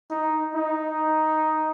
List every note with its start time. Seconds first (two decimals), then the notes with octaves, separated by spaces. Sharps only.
0.11 D#4
0.55 D#4